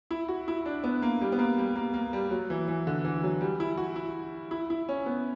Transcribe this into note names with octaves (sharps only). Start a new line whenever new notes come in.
E4
F#4
E4
D4
B3
A#3
G3
B3
A#3
G3
A#3
A#3
G3
F#3
E3
E3
D3
E3
F#3
G3
E4
F#4
E4
E4
E4
C#4
B3